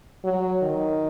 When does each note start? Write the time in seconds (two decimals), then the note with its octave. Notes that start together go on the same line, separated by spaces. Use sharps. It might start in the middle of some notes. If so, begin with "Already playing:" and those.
0.24 F#3
0.62 D#3